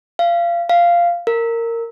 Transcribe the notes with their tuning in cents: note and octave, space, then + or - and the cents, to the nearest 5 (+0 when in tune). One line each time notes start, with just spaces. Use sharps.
F5 -25
F5 -10
A#4 -15